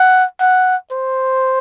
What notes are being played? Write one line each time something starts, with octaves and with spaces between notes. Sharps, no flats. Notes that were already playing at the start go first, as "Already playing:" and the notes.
Already playing: F#5
F#5
C5